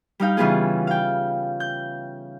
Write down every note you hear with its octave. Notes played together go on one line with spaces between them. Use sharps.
G3 D#4 F5 G5
C#3 E3 G3 B3 F4 G#4
F5 G5
G6